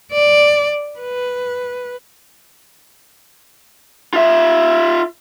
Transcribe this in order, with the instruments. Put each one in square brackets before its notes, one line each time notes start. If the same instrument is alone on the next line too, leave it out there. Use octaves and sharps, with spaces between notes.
[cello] D5
B4
[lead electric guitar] F4 E5